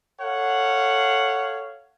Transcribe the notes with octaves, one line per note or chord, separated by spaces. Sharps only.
A4 C#5 F5 F#5